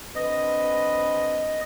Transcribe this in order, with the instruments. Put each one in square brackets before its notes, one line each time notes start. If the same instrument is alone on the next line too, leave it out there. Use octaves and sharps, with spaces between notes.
[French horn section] D3 C4 B4 [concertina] D#5